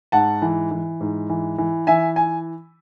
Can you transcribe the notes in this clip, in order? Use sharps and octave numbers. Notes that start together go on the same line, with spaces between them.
G#2 F#5 A5
E3
E3
G#2
E3
E3
E3 E5 G#5
G#5